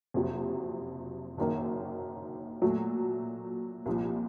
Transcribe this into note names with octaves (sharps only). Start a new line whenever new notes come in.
F#1 F2 C3 F#3
F#1 F#2 D#3 A#3
A#2 F#3 A3
C2 A#2 F3